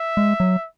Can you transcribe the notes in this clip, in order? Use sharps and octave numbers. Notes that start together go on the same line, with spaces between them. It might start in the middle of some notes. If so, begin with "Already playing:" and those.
Already playing: E5
G#3
F#3